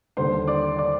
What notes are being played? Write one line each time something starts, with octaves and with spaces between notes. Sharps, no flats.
D#2 D3 G3 C5 C6
D5 D6
D5 D6